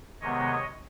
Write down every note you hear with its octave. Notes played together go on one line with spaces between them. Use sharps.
C3 D#3 G#3 B3 C#5 D#5